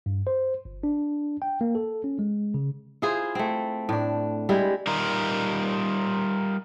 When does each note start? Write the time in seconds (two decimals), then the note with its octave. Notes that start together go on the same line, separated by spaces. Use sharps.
0.06 G2
0.27 C5
0.65 G1
0.83 D4
1.42 G5
1.61 A#3
1.75 A4
2.04 C#4
2.19 G#3
2.54 C#3
3.02 E4 F4 G#4 C5
3.35 A3 C4
3.89 A2 D4
4.49 G3 G#3 E4
4.87 G3 D#4 F4 A#4